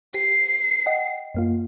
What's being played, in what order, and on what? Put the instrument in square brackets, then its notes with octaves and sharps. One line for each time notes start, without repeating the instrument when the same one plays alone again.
[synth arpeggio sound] G4 [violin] C7
[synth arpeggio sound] D#5 F#5 G5
F#2 A#3 F4